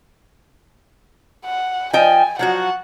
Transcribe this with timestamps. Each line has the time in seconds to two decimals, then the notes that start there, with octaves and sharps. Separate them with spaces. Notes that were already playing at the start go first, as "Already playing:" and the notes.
1.45 F#5
1.93 F3 D#5 G5 G#5
2.39 F3 F#3 F#4 F#5